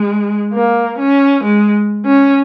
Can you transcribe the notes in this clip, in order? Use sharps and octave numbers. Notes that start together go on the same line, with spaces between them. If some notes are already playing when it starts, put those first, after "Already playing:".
Already playing: G#3
A#3
C#4
G#3
C#4